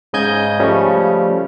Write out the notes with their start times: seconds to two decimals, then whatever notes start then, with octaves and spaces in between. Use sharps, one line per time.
0.13 G#2 C#3 D#5 G#5 G6 G#6
0.60 C#3 F3 G3 A3 C#4